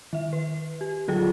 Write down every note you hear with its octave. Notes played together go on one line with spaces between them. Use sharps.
D#3 E5
B4
G4
D3 F#3 F4 G#4 A4 G5